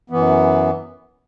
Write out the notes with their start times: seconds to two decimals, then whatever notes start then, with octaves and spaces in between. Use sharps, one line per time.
0.10 F#2 E3 B3